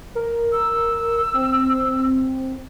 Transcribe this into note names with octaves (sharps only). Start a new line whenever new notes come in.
A#4
E6
C4